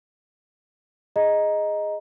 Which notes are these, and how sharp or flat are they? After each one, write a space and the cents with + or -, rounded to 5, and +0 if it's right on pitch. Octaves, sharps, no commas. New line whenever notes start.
G#4 +0 D#5 +0 A#5 +10